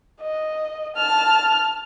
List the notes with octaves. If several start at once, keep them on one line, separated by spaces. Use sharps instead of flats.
D#5
A5 F6